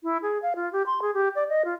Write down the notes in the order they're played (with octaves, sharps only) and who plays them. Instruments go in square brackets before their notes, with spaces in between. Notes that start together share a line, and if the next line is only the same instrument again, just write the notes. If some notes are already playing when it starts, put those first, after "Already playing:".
[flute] E4
G#4
F5
F4
G4
C6
G#4
G4
D5
D#5
F4